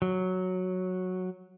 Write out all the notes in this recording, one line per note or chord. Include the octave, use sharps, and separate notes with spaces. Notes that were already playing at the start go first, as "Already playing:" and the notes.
F#3